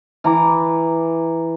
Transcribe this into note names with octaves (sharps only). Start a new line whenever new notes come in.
E3 A#5 D6